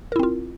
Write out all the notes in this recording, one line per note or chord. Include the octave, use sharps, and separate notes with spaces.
C4 E4 F4 A#4